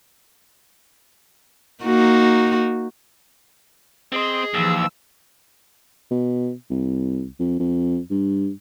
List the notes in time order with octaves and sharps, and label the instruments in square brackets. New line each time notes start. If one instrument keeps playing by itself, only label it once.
[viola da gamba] A#3 D#4 F#4
[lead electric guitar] C4 C5 [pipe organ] G#4 [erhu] D#5
[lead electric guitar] D#2 [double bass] E3 F3 [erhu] E6
[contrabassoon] B2
C2
F2
F2
G2